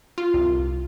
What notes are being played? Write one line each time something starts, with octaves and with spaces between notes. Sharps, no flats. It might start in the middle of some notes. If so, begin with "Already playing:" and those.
F4
C2